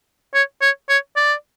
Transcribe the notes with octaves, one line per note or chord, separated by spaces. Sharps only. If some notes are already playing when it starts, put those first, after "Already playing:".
C#5
C#5
C#5
D5